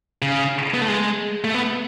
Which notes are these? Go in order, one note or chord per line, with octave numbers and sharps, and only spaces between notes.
C#3
B3
A3
G#3
A3
B3